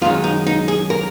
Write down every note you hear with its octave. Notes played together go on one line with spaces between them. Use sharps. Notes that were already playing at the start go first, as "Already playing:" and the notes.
F#2 D#3 G#3 C#4 F4
D#4
D#4
G#4
A#4